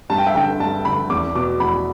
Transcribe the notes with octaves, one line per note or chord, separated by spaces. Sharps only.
G2 A5
G5
E5
D3 G5
G2 A5
D3 B5
E2 D6
B2 D6
E2 B5